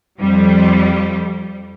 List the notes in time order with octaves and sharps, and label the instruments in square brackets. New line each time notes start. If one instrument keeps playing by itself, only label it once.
[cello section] F2 G3